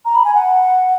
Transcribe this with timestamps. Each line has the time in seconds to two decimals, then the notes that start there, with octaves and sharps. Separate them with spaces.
0.05 A#5
0.15 B5
0.25 G#5
0.34 F#5